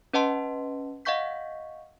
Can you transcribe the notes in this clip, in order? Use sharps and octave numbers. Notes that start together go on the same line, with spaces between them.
C#4 B4 D#5 F#5 A5 C6
D#5 F5 F#5 C#6 G6 B6